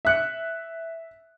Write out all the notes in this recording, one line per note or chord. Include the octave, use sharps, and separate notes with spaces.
E5 F#6 C#7